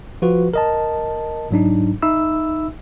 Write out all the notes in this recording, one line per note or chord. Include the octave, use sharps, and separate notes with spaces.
F3 F4 F#4 B4
A#4 D#5 A5
G#2 F#3 D4 D#4
D#4 E5 B5 E6